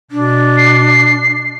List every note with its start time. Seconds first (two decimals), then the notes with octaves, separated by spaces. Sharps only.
0.11 B2 D4
0.58 C7